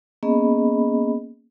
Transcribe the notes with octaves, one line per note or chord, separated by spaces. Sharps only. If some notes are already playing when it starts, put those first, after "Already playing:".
A#3 B3 C#4 G#4 D#5 B5